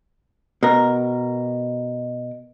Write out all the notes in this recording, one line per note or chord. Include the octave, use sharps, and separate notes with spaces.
B2 A#4